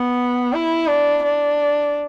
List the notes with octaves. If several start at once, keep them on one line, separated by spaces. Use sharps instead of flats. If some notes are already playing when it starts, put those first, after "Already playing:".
Already playing: B3
E4
D4
D4